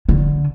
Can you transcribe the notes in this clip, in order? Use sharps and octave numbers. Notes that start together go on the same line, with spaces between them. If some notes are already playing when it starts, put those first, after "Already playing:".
D3